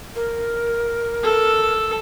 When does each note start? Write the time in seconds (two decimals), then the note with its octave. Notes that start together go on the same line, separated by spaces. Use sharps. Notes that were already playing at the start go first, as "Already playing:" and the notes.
0.16 A#4
1.23 A4